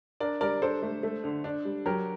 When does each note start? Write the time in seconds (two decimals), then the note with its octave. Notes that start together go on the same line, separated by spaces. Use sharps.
0.20 D4 A#4 D5
0.41 G3 A#4 D5
0.62 D4 A4 C5
0.82 A3
1.03 A3
1.24 D3
1.44 D4
1.65 G3
1.86 F#3 G4 A#4